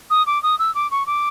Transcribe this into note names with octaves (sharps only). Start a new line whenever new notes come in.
D#6
D6
D#6
E6
D6
C#6
D6